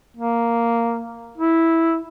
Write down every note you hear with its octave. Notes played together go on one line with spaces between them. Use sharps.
A#3
E4